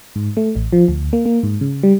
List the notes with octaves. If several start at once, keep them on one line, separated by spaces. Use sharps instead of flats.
G#2
A3
A1
F3
D2
A#3
A#3
G#2
C#3
G3